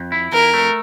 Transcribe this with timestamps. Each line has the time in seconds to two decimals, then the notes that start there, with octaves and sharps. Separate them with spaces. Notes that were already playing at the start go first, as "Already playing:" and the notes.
Already playing: F2
0.12 E4
0.32 F2 A#4
0.54 A3